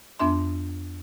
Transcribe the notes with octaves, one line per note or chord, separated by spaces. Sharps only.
F2 B3 D4 E5 C6